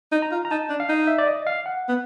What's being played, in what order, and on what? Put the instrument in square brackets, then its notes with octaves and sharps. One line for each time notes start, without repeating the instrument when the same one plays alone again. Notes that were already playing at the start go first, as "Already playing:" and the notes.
[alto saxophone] D#4
[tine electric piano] A#5
[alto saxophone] F4
[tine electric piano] A#5
[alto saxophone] D#4 [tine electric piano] A5
[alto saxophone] D4
[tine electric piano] F5
[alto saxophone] D#4
[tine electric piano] E5
D5
D#5
F5
F#5
[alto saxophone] B3